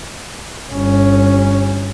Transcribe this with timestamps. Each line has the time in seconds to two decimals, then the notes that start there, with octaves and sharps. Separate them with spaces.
0.72 G1 C#4